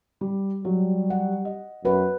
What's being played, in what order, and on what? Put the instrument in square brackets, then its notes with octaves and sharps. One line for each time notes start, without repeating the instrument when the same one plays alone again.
[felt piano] G3
[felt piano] F#3 [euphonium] G3
[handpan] F#5
[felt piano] D#5
[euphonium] F#2 [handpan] F#4 B4